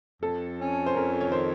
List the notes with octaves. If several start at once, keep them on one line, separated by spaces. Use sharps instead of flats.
F2 A4
C#4
C5
F2 A#4
C#5
D#3 C5